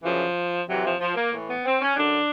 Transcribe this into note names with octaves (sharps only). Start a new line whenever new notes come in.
F#2 C#3 E3 F3
F2 C3 E3 F#3
F3
F3
A#3
A2 E3
B3
C4
C#4
F#2 D3 D4